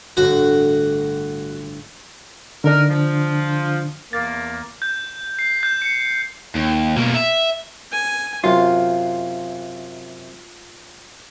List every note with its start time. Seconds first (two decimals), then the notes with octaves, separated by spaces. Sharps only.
0.17 G1 A2 F#4
2.64 D3 D4 D#4 A#4
2.89 F3
4.13 E2 A#3 A6
4.82 G6
5.39 C7
5.63 G6
5.82 C#7
6.55 D#2
6.97 B2 A#3
7.14 E5
7.92 G#5
8.44 F#2 C3 F4